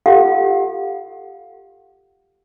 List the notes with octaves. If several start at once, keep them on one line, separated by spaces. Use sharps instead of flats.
F4 G4 A4 F5 F#5